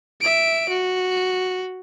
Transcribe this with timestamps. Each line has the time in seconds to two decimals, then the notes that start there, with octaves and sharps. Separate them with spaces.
0.21 E5 D7
0.69 F#4